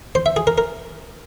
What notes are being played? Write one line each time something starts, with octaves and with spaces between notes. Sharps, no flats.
C5
E5
G#4
A#4
A#4